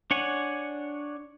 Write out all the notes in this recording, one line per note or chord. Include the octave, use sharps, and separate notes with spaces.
D4 C#5 F#5 G#5